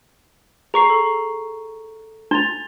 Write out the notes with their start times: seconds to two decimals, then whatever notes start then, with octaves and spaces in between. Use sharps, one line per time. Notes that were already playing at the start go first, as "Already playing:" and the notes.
0.74 G#4 A#5 C#6 C7
0.90 A4
2.31 D4 C6 A6 F7